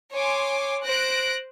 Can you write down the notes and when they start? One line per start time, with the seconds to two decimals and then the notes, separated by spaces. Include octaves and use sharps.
0.13 C#5 G#5 C6 D6
0.85 C5 F#6 A#6 D7